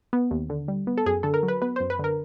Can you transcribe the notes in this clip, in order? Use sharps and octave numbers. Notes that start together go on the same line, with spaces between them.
B3
D#2
D3
G3
B3
A4
F#2 G#4
D3 A4
A#4
F#3
B4
B3 B4
C5
F#2
B4
D3 A#4